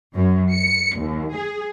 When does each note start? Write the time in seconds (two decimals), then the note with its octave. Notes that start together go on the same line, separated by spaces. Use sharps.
0.15 F#2
0.52 C#7
0.97 D#2
1.35 G#4